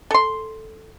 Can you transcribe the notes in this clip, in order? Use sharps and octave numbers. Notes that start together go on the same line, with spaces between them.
A4 C6